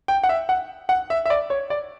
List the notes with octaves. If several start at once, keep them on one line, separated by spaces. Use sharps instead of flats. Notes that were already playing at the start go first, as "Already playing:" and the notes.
G5
F#5
E5
F#5
F#5
E5
E5
D5
C#5
D5